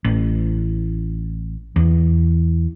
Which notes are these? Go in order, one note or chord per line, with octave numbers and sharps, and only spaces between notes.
A1
E2